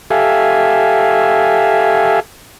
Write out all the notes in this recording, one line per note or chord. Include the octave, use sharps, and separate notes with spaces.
G4 A4 E5 F5 G#5